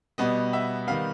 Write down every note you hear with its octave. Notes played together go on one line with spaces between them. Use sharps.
B2 G3 B3 D#5
E5
D#3 G3 B3 F5